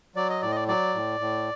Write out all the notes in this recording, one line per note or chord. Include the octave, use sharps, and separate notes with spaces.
F#3 D5
D#5
A2 D5
D#5
D5
F#3 D5
A2
A2